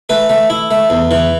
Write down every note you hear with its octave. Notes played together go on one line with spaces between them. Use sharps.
A3 B4
A3
E4
A3
E2
E3